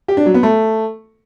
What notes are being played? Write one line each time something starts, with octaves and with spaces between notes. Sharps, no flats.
G4
D4
F#3
B3
A3